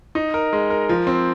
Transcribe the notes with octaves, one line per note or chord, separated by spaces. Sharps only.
D#4
A#4
G#3
A#4
F3
C4